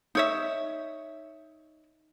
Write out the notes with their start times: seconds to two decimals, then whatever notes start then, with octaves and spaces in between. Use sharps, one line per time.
0.15 D#4 C#5 E5